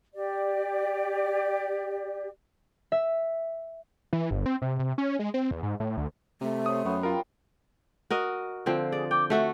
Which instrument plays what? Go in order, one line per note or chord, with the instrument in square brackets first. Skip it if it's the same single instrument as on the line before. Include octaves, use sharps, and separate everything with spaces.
[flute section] G4 D5
[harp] E5
[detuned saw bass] E3
G1
C4
C3
C3
C#4
G#3
C4
E2
G#2
A2
D2
[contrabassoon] C3 [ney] A3 [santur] A#5
[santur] C5 C#5 [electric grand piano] D#6
[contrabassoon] F#2 [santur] B3 C#5
[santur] G3 [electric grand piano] F4 A#4
[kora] F#4 A#4 D#5
D3 F3 C4
[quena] G#4 [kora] D5
[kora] G5 [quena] D6
[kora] A3 F#4 A4 [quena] E5